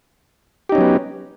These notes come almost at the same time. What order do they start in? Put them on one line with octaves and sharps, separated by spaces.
G4 D#4 C#4 F#3 B3